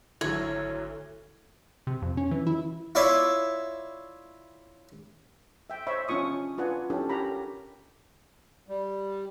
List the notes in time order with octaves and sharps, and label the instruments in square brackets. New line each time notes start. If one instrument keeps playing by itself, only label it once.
[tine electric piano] G#1 A4 [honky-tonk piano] D2 D3 F#3 [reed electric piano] E4 [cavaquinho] C#5
[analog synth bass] C3
F2
C#4
E3
E4
[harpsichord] E4 F4 C#5 D5 E5
[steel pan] E5 G5
C5 C#5 D#5 E5 B5 C#6
C#4 D4 F4 C#6 D#6
D4 F4 B4 D5 F#5 G#5
C#4 D4 E4 G4 A4
G4 A#4 C#5 F#5 A#5 B5
[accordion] G3